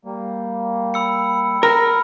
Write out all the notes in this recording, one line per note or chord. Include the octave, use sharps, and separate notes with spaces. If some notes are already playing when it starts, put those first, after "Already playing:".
G3 A#3
B5 E6 C#7
A#4 A#5 B5 F6